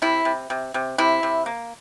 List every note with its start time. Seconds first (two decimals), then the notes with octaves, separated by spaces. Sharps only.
0.02 C3 E4
0.25 C3
0.50 C3
0.74 C3
0.98 C3 E4
1.23 C3
1.46 A#3